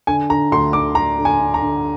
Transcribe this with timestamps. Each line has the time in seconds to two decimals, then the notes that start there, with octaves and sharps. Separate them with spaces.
0.07 D3 G#5
0.30 D3 A#5
0.52 D2 C6
0.73 D3 D6
0.95 D3 A#5
1.18 D3
1.25 G#5
1.40 D3
1.54 A#5
1.62 D3